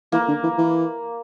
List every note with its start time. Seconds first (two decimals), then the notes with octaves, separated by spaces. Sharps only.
0.12 E3 A#3
0.28 D3
0.44 E3
0.58 E3